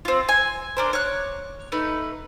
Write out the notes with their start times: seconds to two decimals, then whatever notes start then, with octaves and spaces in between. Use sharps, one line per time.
0.05 C4 F4
0.29 G#5
0.77 D4 A#4 C5
0.93 C#5 F#6
1.72 A3 D#4 B4